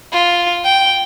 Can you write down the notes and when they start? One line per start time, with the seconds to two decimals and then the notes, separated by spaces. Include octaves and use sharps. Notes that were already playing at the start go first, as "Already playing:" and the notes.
0.12 F4
0.64 G5